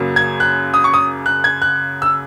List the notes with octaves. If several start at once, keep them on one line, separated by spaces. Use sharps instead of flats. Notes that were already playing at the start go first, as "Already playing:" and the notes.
Already playing: F#2 C#3 F#3 A#3
G#6
F#6
D#6
C#6
D#6
F#6
G#6
F#6
E6